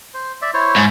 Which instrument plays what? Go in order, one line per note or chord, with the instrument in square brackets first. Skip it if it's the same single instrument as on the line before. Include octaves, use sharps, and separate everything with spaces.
[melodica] C5
D5 E5
E4 C5 C#5
[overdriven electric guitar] G#2